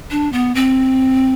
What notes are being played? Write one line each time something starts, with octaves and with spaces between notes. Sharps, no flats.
D4
B3
C4